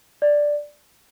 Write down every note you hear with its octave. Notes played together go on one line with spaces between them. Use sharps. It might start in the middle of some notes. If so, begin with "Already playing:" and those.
D5